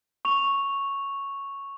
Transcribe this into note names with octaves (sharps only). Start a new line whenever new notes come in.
C#6 F7